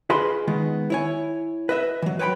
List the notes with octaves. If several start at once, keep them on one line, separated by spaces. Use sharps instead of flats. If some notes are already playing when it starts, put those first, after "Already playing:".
F4 G#4 B4 D#5 B5 C6
D#3 G#3 B3
E4 C#5 G#5
B4 D#5 E5
E3 F#3
B4 C#5 G5 A#5 B5